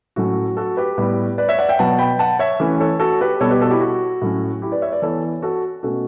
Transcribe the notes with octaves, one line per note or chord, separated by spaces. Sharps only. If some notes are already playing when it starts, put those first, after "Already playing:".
A2 F#3 A3 C#4 F#4
F#4 A4
G4 B4
A2 G3 B3
B4 D5
C#5 E5
D5 F#5
E5 G5
B2 F#3 B3 F#5 A5
G5 B5
F#5 A5
C#5 E5
E3 A3 C#4
A4 C#5
F#4 A4
G4 B4
B2 G3 B3 A4 C#5
G4 B4
F#4 A4
E4 G4
F#4
A2 F#3 A3 C#4
E4 G4
B4 D5
C#5 E5
B4 D5
E3 B3 A4 C#5
F#4 A4
B2 A3 C#4 F#4 A4